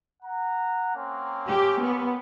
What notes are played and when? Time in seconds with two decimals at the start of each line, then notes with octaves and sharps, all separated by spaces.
0.23 F#5 A#5
0.96 A#3 C4 C#4
1.48 G4
1.84 B3